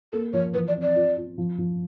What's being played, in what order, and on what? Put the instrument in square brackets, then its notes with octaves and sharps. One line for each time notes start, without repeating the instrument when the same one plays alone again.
[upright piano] A#3 [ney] A4
[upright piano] F3 [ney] C#5
[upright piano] E3 [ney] B4
[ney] D5
[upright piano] C4
[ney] D5
[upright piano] F4
F4
F3
F3